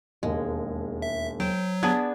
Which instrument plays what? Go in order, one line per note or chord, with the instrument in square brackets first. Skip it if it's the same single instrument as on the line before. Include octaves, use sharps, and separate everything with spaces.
[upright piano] E1 D#2 [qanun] G#3
[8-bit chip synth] E5
[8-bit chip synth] F#3 [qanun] C5 G5
[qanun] B3 D4 G#4 [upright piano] A5 D#6 G#6